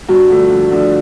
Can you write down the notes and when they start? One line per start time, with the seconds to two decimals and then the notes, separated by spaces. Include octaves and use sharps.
0.09 G2 F#4
0.29 D3 F3 A3 D4
0.51 G2
0.70 D3 F3 A3 D4